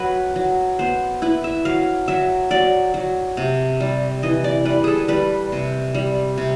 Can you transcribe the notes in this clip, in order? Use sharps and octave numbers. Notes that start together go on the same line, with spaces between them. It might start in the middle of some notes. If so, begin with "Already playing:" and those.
Already playing: F#3 B4
F#3
B3 C5
E4 B4
E5
F#3 F5
F#3 E5
F#3 D5
F#3
C3
G3
E3 D#5
D5
G3 B4
G#4 A4
G3 B4
C3
G3
C3